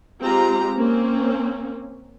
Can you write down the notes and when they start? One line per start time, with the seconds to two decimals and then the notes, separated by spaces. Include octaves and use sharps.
0.22 G#3 C4 F4 G4 A#5
0.77 A#3 C4 C#4